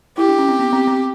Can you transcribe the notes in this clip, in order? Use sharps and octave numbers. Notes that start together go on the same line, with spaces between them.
E4 G4
D4
C#4
C4
B3
C4
C4